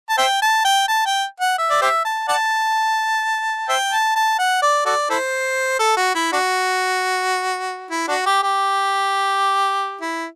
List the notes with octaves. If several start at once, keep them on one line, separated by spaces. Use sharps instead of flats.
A5
C5 E5 G5
A5
G5
A5
G5
F#5
E5
D5
G4 C5 E5
A5
D5 F#5 A5
C5 E5 G5
A5
A5
F#5
D5
F#4 A4 D5
E4 A4 C5
A4
F#4
E4
D4 F#4
E4
D4 F#4
G4
G4
E4